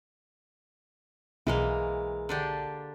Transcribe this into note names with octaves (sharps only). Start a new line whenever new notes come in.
B1 E3 G#3 A#3
D3 D4 G4